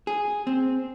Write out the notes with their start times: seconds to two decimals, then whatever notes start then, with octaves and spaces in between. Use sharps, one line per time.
0.07 G#4
0.47 C4